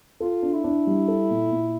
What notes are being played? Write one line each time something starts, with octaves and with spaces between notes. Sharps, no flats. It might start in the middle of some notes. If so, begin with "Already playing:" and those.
F4 A4
D4
E4
D4
G3
A4
A#2
A#2